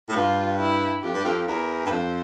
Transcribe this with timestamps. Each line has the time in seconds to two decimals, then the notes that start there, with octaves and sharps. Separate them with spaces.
0.09 A2
0.15 G2 F4
0.59 E4
1.03 F2 G4
1.13 G2
1.24 F2
1.46 E2 A#4
1.84 G2
1.90 F2 C5